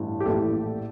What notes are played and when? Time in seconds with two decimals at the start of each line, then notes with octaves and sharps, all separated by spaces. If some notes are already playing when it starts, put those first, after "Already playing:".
Already playing: A1 G2 E3
0.20 G4
0.26 A#1 A2 E3 A4